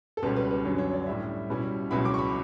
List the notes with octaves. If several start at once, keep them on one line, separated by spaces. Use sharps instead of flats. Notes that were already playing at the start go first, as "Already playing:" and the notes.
A4
C#2 B2 G3 C#4 B4
B4
B4
F#2 D3 F#3 C#5
C#5
D5
A2 G3 C#4 E5
B2 G3 C#4 E4
C#2 B2 F#3 C#4 E4 B5
D6
C#6
B5